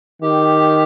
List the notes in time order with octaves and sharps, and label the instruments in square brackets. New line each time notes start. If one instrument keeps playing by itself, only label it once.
[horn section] D#3 [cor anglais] G4